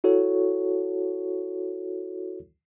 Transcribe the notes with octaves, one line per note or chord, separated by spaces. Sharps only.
E4 F#4 A4 C#5